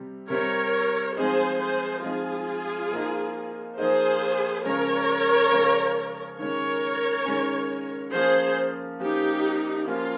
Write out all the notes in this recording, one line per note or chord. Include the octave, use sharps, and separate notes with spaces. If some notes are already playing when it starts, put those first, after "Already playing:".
Already playing: C3 G3 C4
C3 G3 C4 A#4 C#5
F3 G#3 C4 D#4 G#4 C5
G#4 C5
F3 G#3 C4 D#4 F4 G#4
F3 A#3 D#4
F3 A#3 D#4 G#4 C5
C#3 F3 G#3 C#4 A#4 C#5
C#3 F3 G#3 C#4
D#3 G#3 C#4 A#4 C#5
D#3 G#3 C#4
F3 A#3 C#4 G#4 C5
F3 A#3 C#4 D#4 G4
F3 A#3 C#4 F4